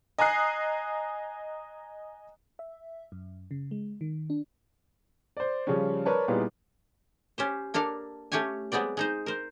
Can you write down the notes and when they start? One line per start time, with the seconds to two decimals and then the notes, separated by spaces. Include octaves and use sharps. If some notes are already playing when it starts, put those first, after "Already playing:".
0.18 D#5 G#5 A#5 D#6 F#6 C7
2.59 E5
3.12 F#2
3.51 C#3
3.71 G#3
4.01 D#3
4.30 D4
5.37 C5 D5
5.67 C#3 F3 G3 C#4
6.06 A#4 B4 C#5 D5 A5
6.28 A#2 G3 B3 D#4 E4 G#4
7.38 C#4 G4 C5
7.74 A#3 D4 A4 F5
8.32 A3 C#4 G4 C#5 G#5
8.72 F#3 G#3 B3 C4 D5
8.97 G#3 D#4 C5
9.26 A#4 C5